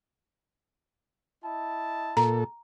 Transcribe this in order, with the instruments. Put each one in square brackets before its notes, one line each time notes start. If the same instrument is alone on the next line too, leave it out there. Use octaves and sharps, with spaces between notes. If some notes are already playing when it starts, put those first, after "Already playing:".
[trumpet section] E4 D#5 A5
[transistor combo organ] A#2 A4 [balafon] A#5